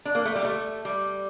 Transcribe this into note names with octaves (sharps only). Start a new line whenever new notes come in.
D4
A#3
A3
G3
A3
G3